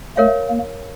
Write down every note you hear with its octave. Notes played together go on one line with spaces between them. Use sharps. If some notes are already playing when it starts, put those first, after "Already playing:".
A3 A#4 C#5 F5
A#3